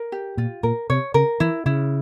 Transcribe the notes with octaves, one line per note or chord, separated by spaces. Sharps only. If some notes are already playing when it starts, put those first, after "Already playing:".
Already playing: A#4
G4
A#2 F4
A#2 A#4
C3 C#5
C#3 A#4
E3 E4
C#3 E4